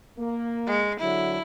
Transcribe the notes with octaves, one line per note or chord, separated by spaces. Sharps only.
A#3
G#3
D3 F#3 E4